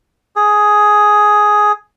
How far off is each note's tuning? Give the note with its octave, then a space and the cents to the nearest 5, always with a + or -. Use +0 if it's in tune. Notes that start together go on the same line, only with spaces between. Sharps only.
G#4 +5